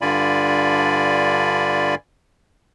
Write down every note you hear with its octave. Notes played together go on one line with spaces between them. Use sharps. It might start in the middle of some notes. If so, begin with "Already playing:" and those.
G2 D3 F4 D5 G#5 B5